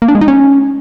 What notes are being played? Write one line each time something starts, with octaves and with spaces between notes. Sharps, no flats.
A#3
D4
G#3
D#4
C#4